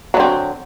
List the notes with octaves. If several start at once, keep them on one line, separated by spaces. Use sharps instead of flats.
D3 F#3 C4